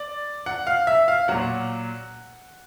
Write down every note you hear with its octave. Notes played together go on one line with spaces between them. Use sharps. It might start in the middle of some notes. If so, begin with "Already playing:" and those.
Already playing: D5
F#5
F5
E5
F5
A#2 F#3 F#5